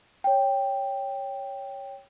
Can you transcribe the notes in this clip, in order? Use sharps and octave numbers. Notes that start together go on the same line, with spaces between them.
C#5 G5